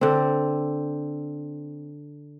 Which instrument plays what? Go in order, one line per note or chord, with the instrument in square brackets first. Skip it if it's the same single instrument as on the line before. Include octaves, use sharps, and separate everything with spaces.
[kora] D3 C4